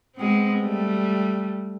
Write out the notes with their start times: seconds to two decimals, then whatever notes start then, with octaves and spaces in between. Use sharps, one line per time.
0.16 G#3 B3 C4
0.61 G3 A3